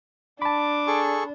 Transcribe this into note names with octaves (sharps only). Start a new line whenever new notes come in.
D4 A5 B5 D6
G#4 A4 C#6